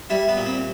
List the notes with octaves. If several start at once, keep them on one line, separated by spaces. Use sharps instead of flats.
G3 E4
B3
A#2
C4